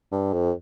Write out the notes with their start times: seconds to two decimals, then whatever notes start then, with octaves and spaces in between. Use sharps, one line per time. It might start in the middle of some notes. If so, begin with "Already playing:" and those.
0.12 G2
0.34 F2